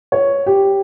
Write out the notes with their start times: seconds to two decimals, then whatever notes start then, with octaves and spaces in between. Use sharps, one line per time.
0.12 C#5
0.46 G4